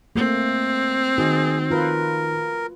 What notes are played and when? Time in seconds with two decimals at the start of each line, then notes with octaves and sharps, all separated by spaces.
0.16 A3 A#3 C4
1.18 D#3 F#4 G#4
1.71 F4 A#4 B4